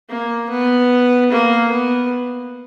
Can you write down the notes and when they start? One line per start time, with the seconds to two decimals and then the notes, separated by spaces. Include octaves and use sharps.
0.09 A#3
0.50 B3
1.31 A#3
1.72 B3